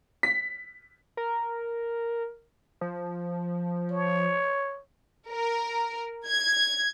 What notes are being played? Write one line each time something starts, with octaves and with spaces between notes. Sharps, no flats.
B6
A#4
F3
C#5
A#4
G#6